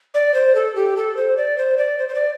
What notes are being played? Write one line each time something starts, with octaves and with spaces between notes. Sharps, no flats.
D5
C5
A4
G4
A4
C5
D5
C5
D5
C5
C5
D5